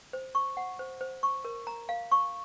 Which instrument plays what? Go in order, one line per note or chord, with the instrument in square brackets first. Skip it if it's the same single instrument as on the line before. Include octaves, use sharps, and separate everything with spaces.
[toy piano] C5
C#6
F#5
C5
C5
C#6
A#4
A#5
F5
C#6